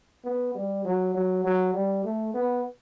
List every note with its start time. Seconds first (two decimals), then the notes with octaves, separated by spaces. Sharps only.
0.25 B3
0.55 G3
0.85 F#3
1.14 F#3
1.44 F#3
1.74 G3
2.04 A3
2.34 B3